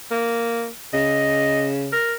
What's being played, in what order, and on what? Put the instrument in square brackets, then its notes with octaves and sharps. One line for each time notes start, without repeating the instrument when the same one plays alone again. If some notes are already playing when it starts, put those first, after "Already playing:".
[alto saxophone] A#3
[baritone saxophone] C#3 [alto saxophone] D#5
[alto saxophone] A#4